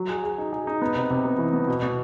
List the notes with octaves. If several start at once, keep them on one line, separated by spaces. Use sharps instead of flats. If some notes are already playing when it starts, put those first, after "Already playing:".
Already playing: F#3
G#4
G#4
D#4
G#4
D#4
B3
C3
C3
B3
E3
B3
B2
B2